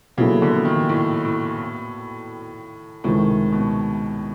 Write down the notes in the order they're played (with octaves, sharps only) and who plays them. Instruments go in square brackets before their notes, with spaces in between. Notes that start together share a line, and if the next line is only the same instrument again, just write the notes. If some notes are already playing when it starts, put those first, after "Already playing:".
[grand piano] A#2 F#3 B3 E4 A4 [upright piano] C#3
[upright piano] D3
D#3
A2
A2
[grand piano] C#2 C3 D#3 G#3 [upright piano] A2
[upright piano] B2